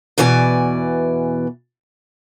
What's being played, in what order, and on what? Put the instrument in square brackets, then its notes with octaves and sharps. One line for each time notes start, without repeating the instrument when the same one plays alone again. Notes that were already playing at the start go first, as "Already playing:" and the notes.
[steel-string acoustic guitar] E2 B2 E3 D5 G#5